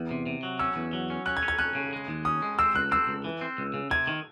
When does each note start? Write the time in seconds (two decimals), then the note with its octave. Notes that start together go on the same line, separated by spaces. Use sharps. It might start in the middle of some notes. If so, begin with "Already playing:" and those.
Already playing: E2
0.11 C3
0.26 C3
0.43 F#3
0.59 C#4 E6
0.76 E2
0.93 F#3
1.10 C#4
1.26 C#4 F#6
1.37 G#6
1.43 C#4
1.48 G#6
1.59 C#4 F#6
1.75 C#3
1.93 G#3
2.08 D#2
2.25 C#4 D#6
2.42 G#3
2.59 C4 E6
2.75 C#2 F#6
2.91 C4 E6
3.07 C#2
3.24 E3
3.41 C4
3.58 C#2
3.74 C#3
3.91 C3 G#6
4.07 D#3